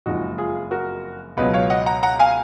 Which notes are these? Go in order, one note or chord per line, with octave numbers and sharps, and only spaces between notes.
F#1 F2 F3 G#3 D#4 F#4
F4 G#4
F#4 A#4
C#2 B2 F#3 B4 D#5
C#5 F5
D#5 F#5
F#5 A#5
F#5 A#5
F5 G#5